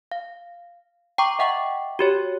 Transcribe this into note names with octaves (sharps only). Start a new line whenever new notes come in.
F5
G5 A#5 C#6 D6
D#5 E5 F#5 G5 C#6 D6
F#4 G4 C#5